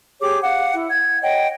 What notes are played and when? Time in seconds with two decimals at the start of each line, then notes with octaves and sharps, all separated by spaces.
0.20 G4 G#4 C#5 D6
0.43 F5 F#5
0.74 E4
0.89 F#5 G#6
1.23 C#5 D#5 F#5 G5